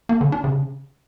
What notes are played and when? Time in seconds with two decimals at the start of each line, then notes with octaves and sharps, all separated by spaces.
0.09 A#3
0.21 D3
0.32 D4
0.44 C#3